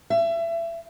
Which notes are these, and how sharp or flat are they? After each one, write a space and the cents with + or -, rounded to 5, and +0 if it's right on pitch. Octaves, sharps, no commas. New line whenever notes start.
E5 +25